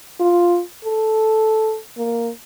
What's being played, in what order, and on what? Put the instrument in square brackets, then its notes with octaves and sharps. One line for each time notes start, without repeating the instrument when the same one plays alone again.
[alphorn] F4
A4
A#3